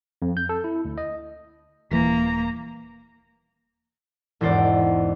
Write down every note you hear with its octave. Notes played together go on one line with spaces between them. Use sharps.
F2
G6
A4
E4
D2
D#5
D#1 E3 A#3 A#5
E1 E2 G#2 C5 D5